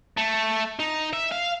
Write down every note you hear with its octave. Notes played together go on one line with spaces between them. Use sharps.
A3
D#4
E5
F5